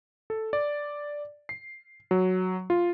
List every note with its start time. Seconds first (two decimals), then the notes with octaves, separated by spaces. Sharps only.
0.30 A4
0.53 D5
1.49 C7
2.11 F#3
2.70 F4